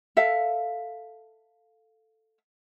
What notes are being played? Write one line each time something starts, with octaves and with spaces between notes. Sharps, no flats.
A4 E5 F5